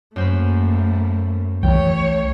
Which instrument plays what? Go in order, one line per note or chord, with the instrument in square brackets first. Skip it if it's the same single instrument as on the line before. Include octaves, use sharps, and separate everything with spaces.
[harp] F#2 C5 B5 [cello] A3 A#3
[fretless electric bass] C2 E3 [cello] A3 C#5 [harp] G5